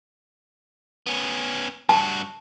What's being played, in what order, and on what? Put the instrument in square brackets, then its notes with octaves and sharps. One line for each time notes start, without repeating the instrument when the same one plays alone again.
[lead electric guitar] B3 C#4
[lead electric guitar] G2 F#4 [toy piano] A5